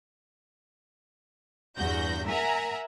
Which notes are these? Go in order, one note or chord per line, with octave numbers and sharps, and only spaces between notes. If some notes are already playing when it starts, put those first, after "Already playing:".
E2 G2 F#4 G6 A#6
A#4 E5 F#5 G#5 A#5